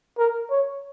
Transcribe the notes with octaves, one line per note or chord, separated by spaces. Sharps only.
A#4
C#5